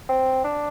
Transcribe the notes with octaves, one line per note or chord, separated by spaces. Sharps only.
C4
D4